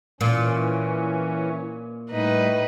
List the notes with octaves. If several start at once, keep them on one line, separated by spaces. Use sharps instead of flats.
A#2 E3 C#4
A2 G3 D#4 B4